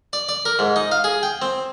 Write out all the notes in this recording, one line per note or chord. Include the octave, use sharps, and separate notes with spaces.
D5
D5
A#4
G#2
D#4
F5
G#4
G5
C4